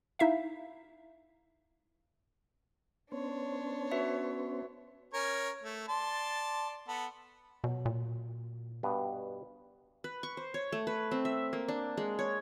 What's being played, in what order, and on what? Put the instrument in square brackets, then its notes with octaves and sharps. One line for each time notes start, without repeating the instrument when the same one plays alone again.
[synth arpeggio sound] D#4 E4 E5 F5
[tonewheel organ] B3 C#4 C5 [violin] D4 C#5
[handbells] F#4 B4 E5
[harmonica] C#4 A#4 C#5
A3
D5 A5 C6
B3 A4
[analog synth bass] B2 [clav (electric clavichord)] F#3
[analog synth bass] A#2
[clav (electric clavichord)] G2 B2 B3
[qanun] B4
C#6
C5
C#5
A3
B4
C4
E5
A#3
D4
G#3
C#5